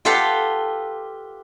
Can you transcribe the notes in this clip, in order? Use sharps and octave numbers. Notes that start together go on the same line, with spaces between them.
F4 G4 A4 B4 F5 F#5